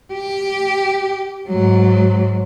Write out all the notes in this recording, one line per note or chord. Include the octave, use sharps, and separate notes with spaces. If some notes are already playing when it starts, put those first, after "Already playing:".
G4
G#2 F#3